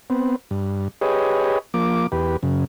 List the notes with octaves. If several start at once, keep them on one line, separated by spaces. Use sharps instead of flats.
B3 C4
G2
G4 G#4 B4 C#5 D#5
F3 A#3 D6
E2 G4 B4
F#2 C#3